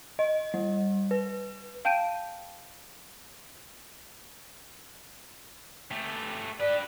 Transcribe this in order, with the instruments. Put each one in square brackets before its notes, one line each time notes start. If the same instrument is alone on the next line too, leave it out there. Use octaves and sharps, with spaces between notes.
[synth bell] D#5
G3
B4
[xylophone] F5 G5 A5 G6 D7 D#7
[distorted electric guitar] A3 G4
[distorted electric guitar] G4 B4 [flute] D5